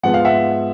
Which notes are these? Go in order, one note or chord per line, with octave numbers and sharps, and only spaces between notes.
G#2 F3 G#3 B3 F#5
F5
E5 F#5